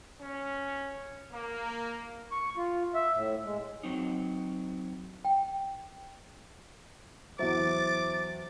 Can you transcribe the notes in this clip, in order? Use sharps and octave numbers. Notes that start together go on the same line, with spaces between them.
C#4
A#3
C#6
F4
E5
A2
G#3
F#3 C4 D#4
G5
E2 F#3 C5 E5 D6 A6